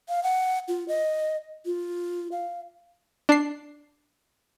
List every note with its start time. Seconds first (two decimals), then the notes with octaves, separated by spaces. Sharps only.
0.09 F5
0.23 F#5
0.68 F4
0.88 D#5
1.66 F4
2.32 F5
3.29 D4 C7